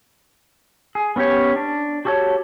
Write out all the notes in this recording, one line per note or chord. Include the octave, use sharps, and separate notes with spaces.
G#4
B3 C#4 F#4 G4 C#5
D4
F#4 G4 A4 B4 C#5